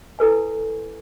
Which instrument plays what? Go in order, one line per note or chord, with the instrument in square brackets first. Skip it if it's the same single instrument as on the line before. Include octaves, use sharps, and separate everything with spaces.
[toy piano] E4 A4 B4 G#5